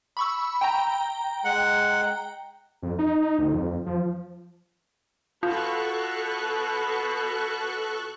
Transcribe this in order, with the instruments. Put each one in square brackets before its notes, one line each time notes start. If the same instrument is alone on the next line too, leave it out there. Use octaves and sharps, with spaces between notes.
[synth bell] B5 C#6 E6
G5 A#5
[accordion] G#3 F#5
[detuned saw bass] F2
D#4
D2
F2
F3
[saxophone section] B2 [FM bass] F4 [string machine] A4 C#6 F#6